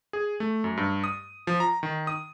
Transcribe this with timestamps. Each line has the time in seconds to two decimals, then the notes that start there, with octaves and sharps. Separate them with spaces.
0.13 G#4
0.40 A3
0.64 F#2
0.77 G2
1.04 D#6
1.47 F3
1.60 A#5
1.83 D#3
2.07 D#6